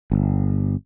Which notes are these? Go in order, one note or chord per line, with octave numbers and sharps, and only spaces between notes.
G1